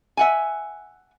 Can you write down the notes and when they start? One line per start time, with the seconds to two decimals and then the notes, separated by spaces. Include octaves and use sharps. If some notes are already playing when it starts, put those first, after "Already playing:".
0.17 E5 F#5 G#5